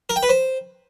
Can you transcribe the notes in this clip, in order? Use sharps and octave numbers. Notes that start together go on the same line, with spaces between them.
A#4
G5
B4
C5